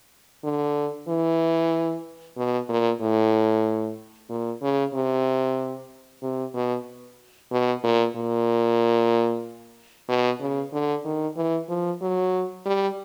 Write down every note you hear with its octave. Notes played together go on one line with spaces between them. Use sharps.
D3
E3
B2
A#2
A2
A#2
C#3
C3
C3
B2
B2
A#2
A#2
B2
C#3
D3
D#3
E3
F3
F#3
G3